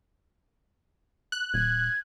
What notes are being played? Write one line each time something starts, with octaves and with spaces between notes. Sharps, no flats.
F#6
D#1 G#6